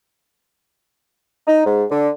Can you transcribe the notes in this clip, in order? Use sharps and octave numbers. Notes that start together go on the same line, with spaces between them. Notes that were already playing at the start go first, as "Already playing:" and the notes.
D#4
G#2
D3